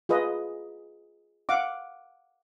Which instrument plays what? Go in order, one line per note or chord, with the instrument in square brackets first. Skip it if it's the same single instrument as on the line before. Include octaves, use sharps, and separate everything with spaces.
[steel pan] F4 G#4 B4 D#5
F5 F#5 D6